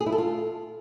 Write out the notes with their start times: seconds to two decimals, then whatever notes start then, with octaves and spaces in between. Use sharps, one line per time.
0.01 G#4
0.06 E4
0.12 A4
0.18 F4